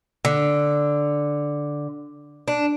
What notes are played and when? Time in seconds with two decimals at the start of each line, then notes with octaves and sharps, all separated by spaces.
0.25 D3
2.48 D4